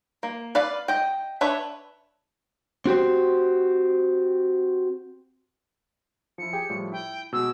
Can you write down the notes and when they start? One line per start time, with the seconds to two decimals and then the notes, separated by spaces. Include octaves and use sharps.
0.23 A#3
0.55 B4 D5 F5
0.88 D#5 G5
1.41 D4 B4 C#5 E5
2.86 C4 F#4 G4 C5
6.38 F3 E4 C#7
6.53 G4 G#4 G5
6.70 A2 F3 G3
6.92 E4 G5
7.33 B2 G#3 E6